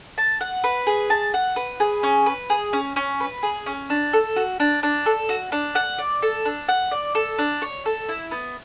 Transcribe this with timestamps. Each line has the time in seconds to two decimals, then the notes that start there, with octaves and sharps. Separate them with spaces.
0.18 A5
0.41 F#5
0.64 B4
0.87 G#4
1.10 A5
1.34 F#5
1.56 B4
1.80 G#4
2.03 C#4
2.26 B4
2.50 G#4
2.73 C#4
2.96 C#4
3.20 B4
3.43 G#4
3.66 C#4
3.90 D4
4.13 A4
4.36 F#4
4.60 D4
4.83 D4
5.06 A4
5.29 F#4
5.52 D4
5.75 F#5
5.98 D5
6.22 A4
6.45 D4
6.69 F#5
6.91 D5
7.15 A4
7.38 D4
7.62 C#5
7.86 A4
8.09 E4
8.31 B3